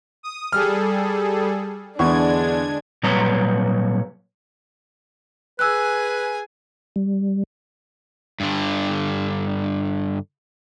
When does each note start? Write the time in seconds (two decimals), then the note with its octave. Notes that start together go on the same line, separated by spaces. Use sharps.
0.23 D#6
0.52 G3 G#4 A4 F6
1.99 E2 D3 G#3 D4 C#6 G#6
3.03 A#2 F#3 G3 B4 C#5 A#5
5.59 G#4 B4 G#5 E6 F#6
6.96 G3
8.40 G2 D3